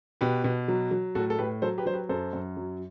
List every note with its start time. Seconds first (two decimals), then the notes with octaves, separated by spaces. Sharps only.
0.21 B2 G4 B4
0.44 B2
0.68 F#3
0.91 F#3
1.15 A2 F#4 A4
1.30 A4
1.38 A2 G4 B4
1.62 F#3 A4 C5
1.78 G4 B4
1.86 F#3 C5
1.93 G4 B4
2.09 F#2 A4 C5
2.33 F#2
2.57 F#3